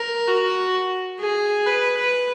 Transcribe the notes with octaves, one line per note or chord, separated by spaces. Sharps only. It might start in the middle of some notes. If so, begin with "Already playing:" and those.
Already playing: A#4
F#4
G#4
B4
B4